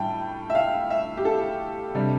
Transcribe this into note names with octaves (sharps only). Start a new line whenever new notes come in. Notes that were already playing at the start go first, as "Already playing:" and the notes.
Already playing: A2 G3 G5 A5
E5
F5
E5
G4
A4
C3 G3 D4